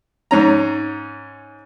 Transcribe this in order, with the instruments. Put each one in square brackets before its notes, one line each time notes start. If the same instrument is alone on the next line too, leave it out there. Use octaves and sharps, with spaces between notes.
[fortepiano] G#2 C#4 A#5